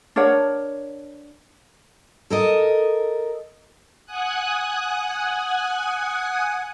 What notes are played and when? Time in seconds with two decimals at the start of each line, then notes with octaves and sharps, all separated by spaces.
0.16 D4 A#4 C#5 F#5
2.30 A4 A#4 D#5
4.06 F#5 G#5 D#6 F#6